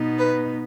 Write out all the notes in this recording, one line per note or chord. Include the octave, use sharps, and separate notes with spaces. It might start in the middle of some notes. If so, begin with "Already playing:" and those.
Already playing: B2 B3 D#4
B4